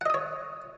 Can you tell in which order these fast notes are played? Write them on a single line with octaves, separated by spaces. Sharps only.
F#5 D#5 D#6 C#5